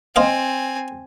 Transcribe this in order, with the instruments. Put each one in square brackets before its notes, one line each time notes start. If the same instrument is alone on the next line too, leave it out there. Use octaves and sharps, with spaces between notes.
[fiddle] C4 G#5 [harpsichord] C5 D#5 F5